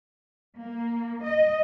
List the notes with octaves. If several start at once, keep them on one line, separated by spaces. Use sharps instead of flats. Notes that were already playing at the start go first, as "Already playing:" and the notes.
A#3
D#5